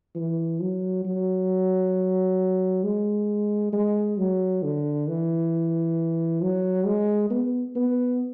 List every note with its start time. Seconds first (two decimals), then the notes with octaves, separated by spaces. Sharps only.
0.15 E3
0.60 F#3
1.05 F#3
2.83 G#3
3.73 G#3
4.18 F#3
4.62 D3
5.08 E3
6.42 F#3
6.86 G#3
7.30 B3
7.75 B3